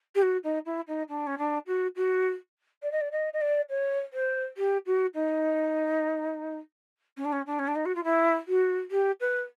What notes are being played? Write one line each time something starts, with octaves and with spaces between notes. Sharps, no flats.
G4
F#4
D#4
E4
D#4
D4
C#4
D4
F#4
F#4
D5
D#5
D5
D#5
D#5
D5
C#5
C5
G4
F#4
D#4
C#4
D4
C#4
D4
C#4
D4
D#4
F#4
F4
E4
F#4
G4
B4